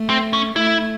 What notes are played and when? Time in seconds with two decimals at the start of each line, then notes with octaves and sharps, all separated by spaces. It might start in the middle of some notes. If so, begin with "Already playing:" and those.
Already playing: A3
0.10 C4
0.33 C#4
0.55 A3 E4